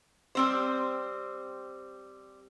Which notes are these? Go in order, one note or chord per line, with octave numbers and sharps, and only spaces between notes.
G3 C4 C5